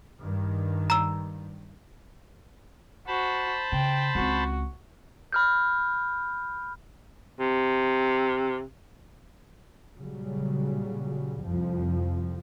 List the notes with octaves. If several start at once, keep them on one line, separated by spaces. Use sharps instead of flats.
G2 D#3
A#5 E6
F#4 C5 A5 B5
C#3 G5
C#2 C4 F#4
B5 F6 G6
C3
A#2 C#3 F#3 G3
C2 F2 F3